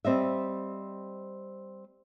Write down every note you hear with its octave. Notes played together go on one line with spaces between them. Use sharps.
G3 C4 D#5 E5